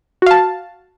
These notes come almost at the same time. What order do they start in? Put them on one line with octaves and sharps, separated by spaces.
F#4 F5 A5